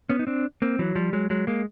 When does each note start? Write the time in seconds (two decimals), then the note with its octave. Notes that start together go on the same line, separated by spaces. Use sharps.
0.10 B3 C#4
0.19 D#4
0.27 C4 D4
0.62 A#3 C4
0.79 E3 F#3
0.95 F3 G3
1.13 F#3 G#3
1.30 F#3 G#3
1.47 G#3 A#3